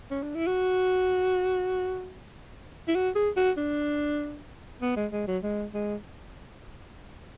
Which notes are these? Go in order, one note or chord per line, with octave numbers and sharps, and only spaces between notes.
C#4
D4
E4
F#4
E4
F#4
G#4
F#4
D4
B3
G#3
G#3
F#3
G#3
G#3